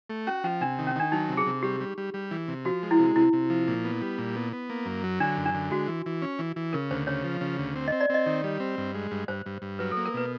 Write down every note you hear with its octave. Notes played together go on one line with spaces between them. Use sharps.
A3
C#4 F#4
F3 C#4
C3 D4
D#3
C#4
D#3 D4
F#3 D#4
C3
G#4
C3
G3 G4
G3
G3
G3
E3
C3
F3 F#4
G#3
E4
C3
C3 E4
C3
F3
A#2
B3
G3
A#2
B3
B3
A#3
F#2
F#3
D3 D4
F#2
D4
D3
G#3 F#4
E3
E3
C#4
E3
E3
C#3 A#4
D2 C5
C#3 C#5
F3
C#3
D2
C4
C4 D#5
D5
C4 D#5
D#3
G3
C4
G2
G#3
G2
G2 C5
G2
G2
F#3 B4
A4
A#3
A#4
B2 B4